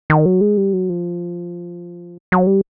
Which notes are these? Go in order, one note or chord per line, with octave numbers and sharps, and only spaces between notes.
D#3
F#3
G#3
G3
F#3
F3
F#3
G3